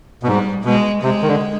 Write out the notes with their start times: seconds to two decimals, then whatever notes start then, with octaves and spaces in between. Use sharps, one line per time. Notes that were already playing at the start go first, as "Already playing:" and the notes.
0.23 B2
0.27 G#2 G3
0.65 B2 G#3
1.03 C3 G#3
1.22 D#3
1.28 D3